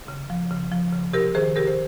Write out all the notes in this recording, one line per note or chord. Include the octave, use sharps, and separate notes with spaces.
C#3
F3
C#3
F3
C#3
C3 G4 A#4
D#3 G#4 C5
C3 G4 A#4
C5